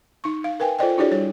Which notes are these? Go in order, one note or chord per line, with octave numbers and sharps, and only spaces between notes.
D#4 C#6
F5
A#4 B4 G5 G#5
F4 A4 C5 D5 D#5 G5
D4 E4 F#4 G#4 C#5 D5
G3 C#5